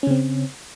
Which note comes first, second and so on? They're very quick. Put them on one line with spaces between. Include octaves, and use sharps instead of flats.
C#4 C#3 C4